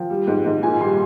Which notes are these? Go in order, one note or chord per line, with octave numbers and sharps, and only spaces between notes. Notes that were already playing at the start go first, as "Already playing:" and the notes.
Already playing: F3 G5
G3
G#2
G#2
A#2 G#5
G3 C6